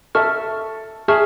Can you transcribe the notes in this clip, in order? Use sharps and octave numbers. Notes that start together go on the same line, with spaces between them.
A4 E5 A5 C#6 F6
G#4 E5 A5 C#6 F6